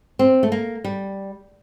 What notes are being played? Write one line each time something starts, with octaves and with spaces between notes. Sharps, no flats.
C4
A3
A#3
G3